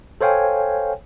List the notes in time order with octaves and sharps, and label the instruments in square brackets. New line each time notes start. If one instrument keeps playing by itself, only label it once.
[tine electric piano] A4 C5 C#5 F5 G5 G#5